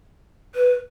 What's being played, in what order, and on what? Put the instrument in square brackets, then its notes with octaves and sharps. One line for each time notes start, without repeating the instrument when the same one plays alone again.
[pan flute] B4